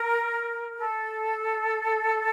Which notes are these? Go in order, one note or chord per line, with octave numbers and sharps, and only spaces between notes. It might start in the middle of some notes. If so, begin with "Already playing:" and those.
Already playing: A#4
A4